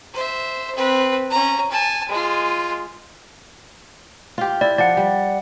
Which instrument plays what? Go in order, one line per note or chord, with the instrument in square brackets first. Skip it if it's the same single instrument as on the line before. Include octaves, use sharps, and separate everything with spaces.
[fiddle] C5 E5
C4 B4
C#4 A#5
G#5 A5
G#3 F4
[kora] F4 G4
[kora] E4 [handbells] D5
[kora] F3 [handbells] D5 F#5
[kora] G3